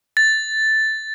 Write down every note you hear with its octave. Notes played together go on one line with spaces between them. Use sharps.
A6